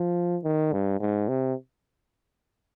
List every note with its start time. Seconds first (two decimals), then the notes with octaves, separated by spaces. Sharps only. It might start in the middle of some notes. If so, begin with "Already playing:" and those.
Already playing: F3
0.44 D#3
0.72 G2
1.00 G#2
1.28 C3